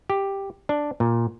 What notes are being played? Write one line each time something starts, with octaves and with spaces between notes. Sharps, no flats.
G4
D4
A#2